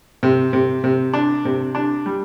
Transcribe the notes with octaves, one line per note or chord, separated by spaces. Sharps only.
C3
C3
C3
D4
C3
D4
G3